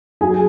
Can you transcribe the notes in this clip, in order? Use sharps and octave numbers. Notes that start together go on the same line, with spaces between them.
F#3 G#4 G#5